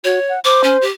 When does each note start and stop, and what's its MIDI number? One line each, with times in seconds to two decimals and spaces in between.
0.04 0.19 66
0.04 0.32 73
0.29 0.39 78
0.45 0.84 72
0.45 0.62 86
0.64 0.77 61
0.82 0.90 67